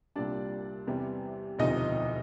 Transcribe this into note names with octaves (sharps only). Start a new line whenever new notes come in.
C2 A#2 G3 D4 D5
E2 C3 E3 G3
E1 D2 C3 F3 D#4 D#5